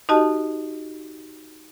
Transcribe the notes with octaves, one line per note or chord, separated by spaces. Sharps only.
D#4 F#4 G4 D#5 A5